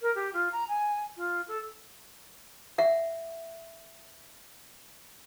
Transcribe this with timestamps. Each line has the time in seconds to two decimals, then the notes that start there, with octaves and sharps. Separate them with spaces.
0.01 A#4
0.15 G4
0.33 F4
0.52 A#5
0.68 G#5
1.17 F4
1.48 A4
2.78 E5 F#5